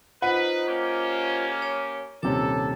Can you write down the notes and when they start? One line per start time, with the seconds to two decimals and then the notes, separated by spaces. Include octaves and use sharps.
0.22 D#4 F4 B4 C5 D#5 F#5
0.68 A#3 C#4 G4
1.62 C#5
2.23 D#1 C3 C#4 A4 D6